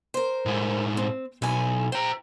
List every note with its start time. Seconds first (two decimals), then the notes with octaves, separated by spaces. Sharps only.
0.14 A#4 C5
0.46 A2 G#3
0.97 C4
1.42 B1 E4 G#5
1.92 C5 G5 A#5